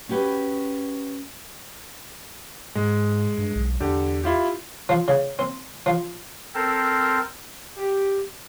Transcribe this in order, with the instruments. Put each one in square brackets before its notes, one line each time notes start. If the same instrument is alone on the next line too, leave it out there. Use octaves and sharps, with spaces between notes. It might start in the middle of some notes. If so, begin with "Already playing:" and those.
[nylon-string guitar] C#4 F#4 G4 B4
[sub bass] G#2 [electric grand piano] G#3
[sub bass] G2
B1
[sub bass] E2 [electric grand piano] D3 G4
[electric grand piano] E4 F4 G4
[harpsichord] F3
C#3
C4
F3
[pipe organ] C4 A4 A#4 C5
[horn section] G4